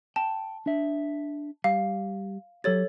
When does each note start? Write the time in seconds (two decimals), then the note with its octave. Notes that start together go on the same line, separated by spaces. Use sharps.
0.16 G5 A5
0.66 D4 E5
1.64 G3 F5
2.64 F#3 G4 A4 C#5 A6